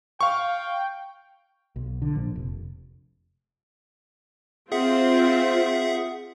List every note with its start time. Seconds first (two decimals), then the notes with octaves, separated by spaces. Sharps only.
0.21 F5 G5 C#6
1.76 B1
2.02 D3
2.15 A#1
2.36 F1
4.72 C4 F4 G#4 E5 F#5